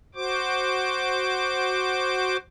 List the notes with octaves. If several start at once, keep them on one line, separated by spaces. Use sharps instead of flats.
F#4 C5 D6